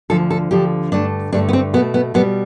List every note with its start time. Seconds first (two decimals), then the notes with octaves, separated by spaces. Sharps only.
0.10 D2 D3 F3 A4
0.30 A4
0.51 D2 D3 F3 G4
0.92 G2 D3 A3 D4
1.33 G2 D3 A3 D4
1.49 B3
1.53 C4
1.74 B2 A3 B3
1.94 B3
2.14 B2 G3 B3